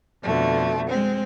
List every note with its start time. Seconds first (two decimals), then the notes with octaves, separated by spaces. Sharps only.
0.24 F2 B2 D3 A3
0.91 G#3 C4